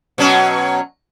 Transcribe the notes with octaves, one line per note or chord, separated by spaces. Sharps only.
B2 F#3 C#4